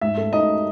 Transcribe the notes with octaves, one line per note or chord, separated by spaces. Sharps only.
G#2 E5
A3
D#4 D#5